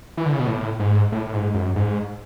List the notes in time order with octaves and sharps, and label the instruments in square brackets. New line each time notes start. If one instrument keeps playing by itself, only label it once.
[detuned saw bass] E3
D3
C#3
B2
A2
G#2
A2
A2
G#2
F#2
G#2